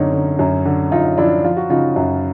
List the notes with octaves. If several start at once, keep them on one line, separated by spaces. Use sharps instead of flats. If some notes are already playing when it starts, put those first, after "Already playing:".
Already playing: F#2 D3 C4 C#4 D#4
D3
F#2
D3
F#2 D#4 F4
F3 D4 E4
F3 F4
F#4
C#3 D#4 F4
F#2